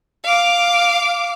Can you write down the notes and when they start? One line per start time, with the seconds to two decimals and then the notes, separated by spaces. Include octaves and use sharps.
0.24 F5 D6